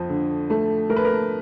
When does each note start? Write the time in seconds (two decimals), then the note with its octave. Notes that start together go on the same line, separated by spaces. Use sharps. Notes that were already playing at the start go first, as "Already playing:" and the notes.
Already playing: F2 F3
0.09 D3
0.50 A3
0.90 A3 A#4
0.96 B4
1.05 A#4